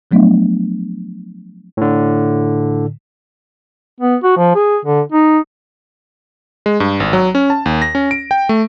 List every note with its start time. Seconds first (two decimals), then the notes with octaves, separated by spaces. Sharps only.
0.11 F3 F#3 A3 B3 D4
1.77 A2 D3
4.00 B3
4.23 F#4
4.37 F3
4.55 G#4
4.85 D3
5.12 D#4
6.66 G#3
6.80 G2
7.00 G#1
7.13 F#3
7.35 C#4
7.50 A5
7.66 D#2
7.82 A#6
7.95 C#4
8.11 D7
8.31 G5
8.49 A3